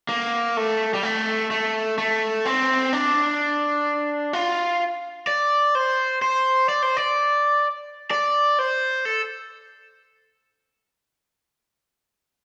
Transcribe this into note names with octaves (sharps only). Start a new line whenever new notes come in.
A#3
A3
G3
A3
A3
A3
C4
D4
F4
D5
C5
C5
D5
C5
D5
D5
C5
A4